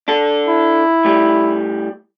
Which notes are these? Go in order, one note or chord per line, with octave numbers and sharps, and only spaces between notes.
D4 A4
E4
A2 G3